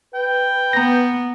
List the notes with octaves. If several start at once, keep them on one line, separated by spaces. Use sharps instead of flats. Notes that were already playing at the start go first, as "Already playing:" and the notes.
B4 G5
B3 A#5 A#6